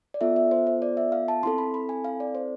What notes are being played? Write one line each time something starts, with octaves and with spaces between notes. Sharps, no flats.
D5
B3 F4 A4 E5
E5
C5
C5
D5
E5
F5
A5
C4 E4 A4 C6
B5
B5
G#5
F5
D5
C5